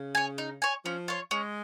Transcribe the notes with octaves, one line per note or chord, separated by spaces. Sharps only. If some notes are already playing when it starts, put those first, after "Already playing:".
Already playing: C#3
C#5 G#5
D#4
C#5 G#5
F3 C#4
F4 C#5
G#3 C#4